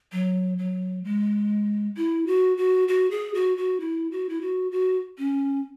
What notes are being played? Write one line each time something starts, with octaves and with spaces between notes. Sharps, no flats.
F#3
F#3
G#3
E4
F#4
F#4
F#4
G#4
F#4
F#4
E4
F#4
E4
F#4
F#4
C#4